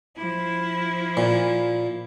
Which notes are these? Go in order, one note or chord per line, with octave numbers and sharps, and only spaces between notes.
F3 E4
A#2